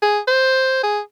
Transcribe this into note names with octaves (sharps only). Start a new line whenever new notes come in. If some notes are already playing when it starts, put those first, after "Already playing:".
G#4
C5
G#4